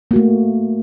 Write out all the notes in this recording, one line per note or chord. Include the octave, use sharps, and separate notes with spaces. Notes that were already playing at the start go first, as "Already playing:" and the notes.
A3 A#3 F#4